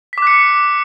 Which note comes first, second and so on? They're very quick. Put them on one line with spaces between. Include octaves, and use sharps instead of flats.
B6 D6 F#6 C#7